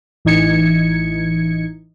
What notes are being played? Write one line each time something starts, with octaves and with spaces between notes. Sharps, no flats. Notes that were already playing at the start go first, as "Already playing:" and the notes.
A1 E3 D#4 G#6 C#7